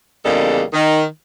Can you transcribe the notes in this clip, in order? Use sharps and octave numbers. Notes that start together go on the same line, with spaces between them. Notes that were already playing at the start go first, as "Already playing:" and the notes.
E2 C#3 G3 A#3 D#4 A4
D#3